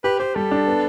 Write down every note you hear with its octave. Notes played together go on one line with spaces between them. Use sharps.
G4 B4
G4 C5
G3 A4
D4
B3